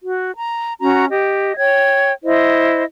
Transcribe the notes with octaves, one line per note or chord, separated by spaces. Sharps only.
F#4
A#5
C#4 F#4 A#5
G4 D#5
C#5 G5 G#6
E4 C5 D#5